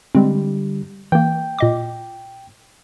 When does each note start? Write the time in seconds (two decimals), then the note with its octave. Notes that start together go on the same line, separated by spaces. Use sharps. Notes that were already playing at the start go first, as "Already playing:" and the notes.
0.15 D3 G3 G#3 C4
1.12 E3 A#3 G5
1.59 A#2 D#5 D6